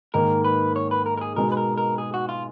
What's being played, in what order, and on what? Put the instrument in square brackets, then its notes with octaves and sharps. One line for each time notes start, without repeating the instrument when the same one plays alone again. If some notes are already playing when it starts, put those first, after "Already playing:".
[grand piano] G#2 D#3 A#3 [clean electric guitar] A#4
[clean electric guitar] B4
C#5
B4
A#4
A#4
G#4
[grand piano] B2 G#3 B3 D#4 [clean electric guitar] A#4
[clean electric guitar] B4
A#4
A#4
G#4
F#4
F4